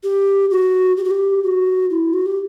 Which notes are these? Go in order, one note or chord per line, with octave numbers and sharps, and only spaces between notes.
G4
F#4
G4
F#4
G4
F#4
E4
F#4
G4